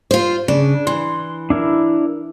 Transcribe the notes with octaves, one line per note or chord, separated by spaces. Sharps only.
F4 C5
C#3 D4
E3 C6
D4 E4 A#4